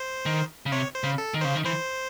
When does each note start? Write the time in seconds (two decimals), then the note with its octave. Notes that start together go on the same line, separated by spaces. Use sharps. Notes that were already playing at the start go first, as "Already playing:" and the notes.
Already playing: C5
0.26 D#3
0.66 C#3
0.72 C3 C#5
0.95 C5
1.04 C#3
1.18 A4
1.34 D#3
1.41 C#3 C5
1.55 D#3
1.64 E3 C5